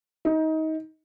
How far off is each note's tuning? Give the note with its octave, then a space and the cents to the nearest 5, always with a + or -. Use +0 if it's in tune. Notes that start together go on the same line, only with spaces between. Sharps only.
D#4 +25